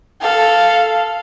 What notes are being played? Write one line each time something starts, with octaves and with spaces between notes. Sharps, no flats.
A4 F5